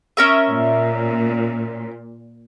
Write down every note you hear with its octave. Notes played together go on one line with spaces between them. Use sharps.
C#4 A#4 E5
A#2